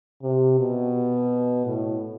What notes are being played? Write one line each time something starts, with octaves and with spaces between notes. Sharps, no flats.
C3
B2
A2